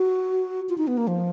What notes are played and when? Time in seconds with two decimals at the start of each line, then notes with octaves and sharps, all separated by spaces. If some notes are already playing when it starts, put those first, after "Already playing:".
Already playing: F#4
0.69 F4
0.78 D#4
0.87 B3
0.97 A#3
1.07 F3